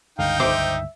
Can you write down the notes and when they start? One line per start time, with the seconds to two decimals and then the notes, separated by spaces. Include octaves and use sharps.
0.19 C#2 G2 D3 D#4 F5 G5
0.40 B1 C5 E5 D6